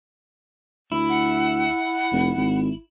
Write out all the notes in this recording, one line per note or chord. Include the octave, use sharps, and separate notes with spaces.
D2 E4
F#5
F1
G#1